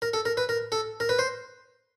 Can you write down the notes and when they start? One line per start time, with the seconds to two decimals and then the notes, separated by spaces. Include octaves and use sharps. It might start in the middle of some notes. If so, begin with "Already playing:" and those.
0.02 A#4
0.13 A4
0.25 A#4
0.37 B4
0.49 A#4
0.72 A4
1.00 A#4
1.09 B4
1.19 C5